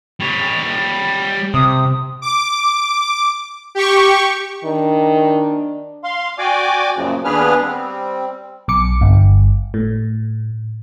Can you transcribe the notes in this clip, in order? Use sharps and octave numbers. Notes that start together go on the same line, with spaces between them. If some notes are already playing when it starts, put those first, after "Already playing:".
G3 C#5
C3 D#6
D6
G4 C#6
D#3 D4
F5 C6
F#4 D5 G5 G#5 D6
F#2 A#2 C#3 F3
D#2 B3 D4 G#4 B4 F6
G3 C4
B1 D6 C#7
G1
A2